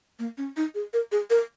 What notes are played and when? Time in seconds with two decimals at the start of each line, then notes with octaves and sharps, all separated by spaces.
0.19 A#3
0.38 C#4
0.57 D#4
0.75 G#4
0.93 A#4
1.12 G#4
1.30 A#4